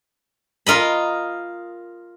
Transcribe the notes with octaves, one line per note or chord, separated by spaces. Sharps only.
F4 A#4 D#5 B5